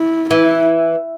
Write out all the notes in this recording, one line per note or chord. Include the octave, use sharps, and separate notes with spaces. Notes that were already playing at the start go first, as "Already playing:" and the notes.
Already playing: E4
E3 E4